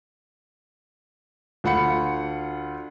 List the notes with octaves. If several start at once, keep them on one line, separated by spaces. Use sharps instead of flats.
D2 F4 F#5 B5 C#7